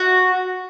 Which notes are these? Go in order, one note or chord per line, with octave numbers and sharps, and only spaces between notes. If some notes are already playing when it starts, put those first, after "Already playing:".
Already playing: F#4